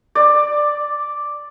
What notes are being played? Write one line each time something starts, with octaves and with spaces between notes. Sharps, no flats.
D5